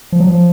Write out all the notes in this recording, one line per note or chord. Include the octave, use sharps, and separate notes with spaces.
F3
F#3
F3